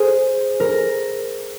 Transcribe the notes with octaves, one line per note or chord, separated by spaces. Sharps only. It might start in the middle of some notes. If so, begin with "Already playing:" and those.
Already playing: G#4 C5
A#4